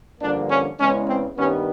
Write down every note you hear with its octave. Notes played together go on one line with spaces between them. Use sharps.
G2 D3 F3 A#3 D4
C#4
E2 C#3 E3 G#3 C#4
C4
G2 D#3 G3 B3 C#4